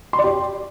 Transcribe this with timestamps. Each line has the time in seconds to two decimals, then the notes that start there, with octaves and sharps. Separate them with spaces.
0.13 C6
0.19 D5
0.24 G4